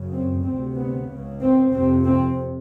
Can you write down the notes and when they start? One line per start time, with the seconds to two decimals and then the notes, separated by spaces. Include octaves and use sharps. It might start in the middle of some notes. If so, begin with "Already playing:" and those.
Already playing: F#2 C#3
0.12 C4
0.44 D2 C3 C4
0.77 B3
1.08 C#2 C#3
1.42 C4
1.73 F2 C3 C4
2.05 C4